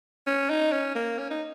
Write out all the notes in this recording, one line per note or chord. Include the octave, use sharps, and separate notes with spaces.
C#4
D#4
C#4
A#3
C#4
D#4